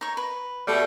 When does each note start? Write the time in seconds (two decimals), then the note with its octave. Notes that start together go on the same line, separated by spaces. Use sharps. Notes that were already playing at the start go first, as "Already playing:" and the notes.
0.01 D#4 C#5
0.17 B4
0.68 B2 G3 A3